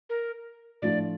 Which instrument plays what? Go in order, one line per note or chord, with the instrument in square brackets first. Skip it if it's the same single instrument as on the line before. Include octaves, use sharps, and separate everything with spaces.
[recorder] A#4
[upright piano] A2 F3 A3 D4 F4 [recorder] D5